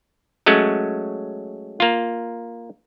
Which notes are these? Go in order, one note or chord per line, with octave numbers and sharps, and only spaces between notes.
F#3 G#3 A3 C#4
A#3 F4